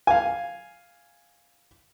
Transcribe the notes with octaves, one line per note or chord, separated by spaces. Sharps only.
F5 G#5